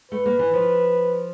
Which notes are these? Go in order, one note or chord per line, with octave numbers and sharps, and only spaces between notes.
A3 B4
A#3
E3
F3